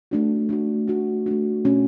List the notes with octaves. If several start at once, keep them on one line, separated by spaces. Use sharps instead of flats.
A3 D4 F#4
A3 D4 F#4
A3 D4 F#4
A3 D4 F#4
B2 A3 C#4 F#4